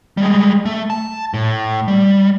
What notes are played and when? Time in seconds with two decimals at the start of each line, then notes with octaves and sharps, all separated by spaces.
0.17 G3 G#3
0.65 A3
0.90 A5
1.34 A2
1.88 G3